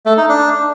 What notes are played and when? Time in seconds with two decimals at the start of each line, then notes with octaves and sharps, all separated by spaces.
0.06 A3
0.17 D#4
0.29 D4